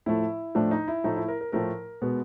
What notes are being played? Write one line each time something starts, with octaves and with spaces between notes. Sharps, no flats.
A2 F3 A3 E4
A2 F3 A3 D4
D#4
E4
A2 F3 A3 D#4
E4
A#4
A#4
A2 F3 A3 A#4
B2 G#3 B3